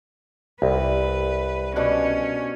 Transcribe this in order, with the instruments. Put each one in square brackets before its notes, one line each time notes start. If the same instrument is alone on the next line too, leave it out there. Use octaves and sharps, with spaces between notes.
[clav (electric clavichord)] C2 [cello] B4
[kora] B2 D4 F#5 [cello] C#4